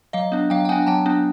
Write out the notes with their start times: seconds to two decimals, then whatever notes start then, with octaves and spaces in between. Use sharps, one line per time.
0.13 F#3 D#5 F5
0.32 B3 D4
0.50 F#3 F5 G5
0.65 G5
0.69 B3 D4 F#5 G#5
0.87 F#3 G5 A5
1.06 B3 D4